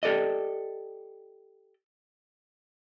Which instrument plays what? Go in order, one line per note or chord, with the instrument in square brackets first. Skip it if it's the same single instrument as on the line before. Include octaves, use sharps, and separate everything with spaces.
[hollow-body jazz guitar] G4 A4 D5 D#5